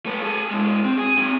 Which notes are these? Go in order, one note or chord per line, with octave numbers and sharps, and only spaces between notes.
A3 B4
G#4 A4
B2 G#3
C4
G#4
C4 G#4